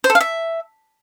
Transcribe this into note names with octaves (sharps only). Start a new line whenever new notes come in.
C5
A4
F5
E5